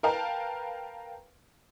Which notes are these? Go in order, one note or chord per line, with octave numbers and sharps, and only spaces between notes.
A#4 B4 F5 G5 A5 A#5